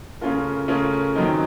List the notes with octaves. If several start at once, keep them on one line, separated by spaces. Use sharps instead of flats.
C#3 A3 C#4 F4 A#4
C#3 A3 C#4 F4 A#4
F#2 D#3 F#3 C4 D#4